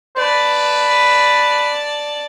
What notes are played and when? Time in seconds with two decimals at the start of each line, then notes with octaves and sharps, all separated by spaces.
0.17 B4 D5 A5